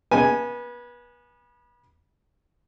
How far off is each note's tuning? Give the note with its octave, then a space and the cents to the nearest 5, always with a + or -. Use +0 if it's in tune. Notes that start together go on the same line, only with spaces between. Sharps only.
B3 -30 G#5 +0